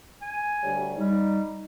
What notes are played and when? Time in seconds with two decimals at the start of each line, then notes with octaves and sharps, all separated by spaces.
0.22 G#5
0.63 D2 G3 C#5
0.98 G3 D#4